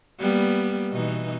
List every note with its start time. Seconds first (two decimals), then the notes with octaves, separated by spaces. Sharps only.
0.20 G3 A#3 B3
0.91 B2 E3 D#4